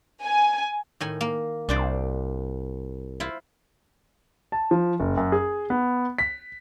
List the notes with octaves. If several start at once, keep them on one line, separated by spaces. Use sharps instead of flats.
G#5
A2 D#3 G#5
A#3
C2 D4 C5 D5
E4 F4 C5
A5
F3
F#1
F#2
G#4
B3
B6